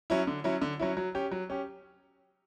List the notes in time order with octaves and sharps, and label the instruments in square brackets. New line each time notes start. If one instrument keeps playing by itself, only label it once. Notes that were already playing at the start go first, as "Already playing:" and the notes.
[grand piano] F#3 C#4 E4
D3
F#3 C#4 E4
D3
F#3 C#4 E4
F#3
C#4 G4
F#3
C#4 G4